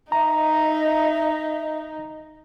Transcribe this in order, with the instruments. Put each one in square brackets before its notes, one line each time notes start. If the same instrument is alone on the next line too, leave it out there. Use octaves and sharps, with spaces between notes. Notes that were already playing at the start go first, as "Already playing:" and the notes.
[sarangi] D#4 [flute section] D#5 E5 [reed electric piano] A#5